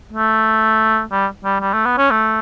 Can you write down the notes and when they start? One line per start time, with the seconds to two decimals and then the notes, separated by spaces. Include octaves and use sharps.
0.13 A3
1.12 G3
1.44 G3
1.61 G3
1.74 A3
1.85 B3
1.98 C#4
2.10 A3